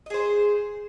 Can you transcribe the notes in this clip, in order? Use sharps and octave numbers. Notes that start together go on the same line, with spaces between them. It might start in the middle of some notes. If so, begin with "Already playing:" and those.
G#4 C5 D#5